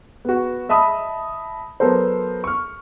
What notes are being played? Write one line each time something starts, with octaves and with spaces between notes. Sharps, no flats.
B3 F#4
D#5 E5 A5 B5 D#6
F#3 B3 A4 A#4 C5
C#6 F6